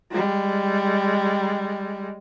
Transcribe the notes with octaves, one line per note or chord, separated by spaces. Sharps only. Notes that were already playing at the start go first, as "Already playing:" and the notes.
G3 G#3